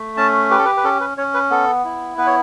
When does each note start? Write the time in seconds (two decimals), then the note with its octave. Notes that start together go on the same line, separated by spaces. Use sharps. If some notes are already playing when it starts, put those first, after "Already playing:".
Already playing: A3
0.17 C#4 A5
0.50 G4 B4
0.58 A4
0.65 B4
0.77 B4
0.84 C#4 A4
1.00 B4
1.18 C#4 C#5
1.34 B4
1.50 B3 A4
1.85 E4
2.18 B3 B4
2.27 C#5